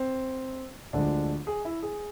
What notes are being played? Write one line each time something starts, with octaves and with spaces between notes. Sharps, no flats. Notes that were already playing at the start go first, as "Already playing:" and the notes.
Already playing: C4
D2 D3 F3 G#3 D4
G#4
E4
G#4